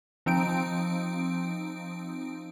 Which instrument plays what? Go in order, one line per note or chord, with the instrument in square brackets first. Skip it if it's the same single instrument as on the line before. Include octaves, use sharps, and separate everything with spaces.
[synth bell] F3 C4 D#4 D7